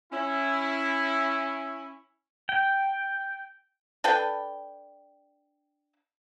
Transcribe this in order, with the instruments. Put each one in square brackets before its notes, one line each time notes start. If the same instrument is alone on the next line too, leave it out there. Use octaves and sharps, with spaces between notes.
[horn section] C#4 E4
[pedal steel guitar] G5
[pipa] D4 A4 B4 G5